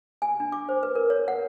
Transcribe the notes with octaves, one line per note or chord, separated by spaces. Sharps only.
G#5
D4
D6
C5
B4
A#4
C#5
F#5